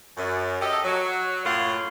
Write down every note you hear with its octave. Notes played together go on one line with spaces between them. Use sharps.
F#2
G4 A4 D#5
F#3
F#2 A2 A#3 F4 C#5 F#5